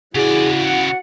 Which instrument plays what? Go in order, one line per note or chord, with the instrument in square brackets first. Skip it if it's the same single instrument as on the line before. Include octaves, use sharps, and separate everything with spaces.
[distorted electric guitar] C#3 D5 [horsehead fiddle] E4 [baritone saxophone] F#4 [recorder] G#4
[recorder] F#5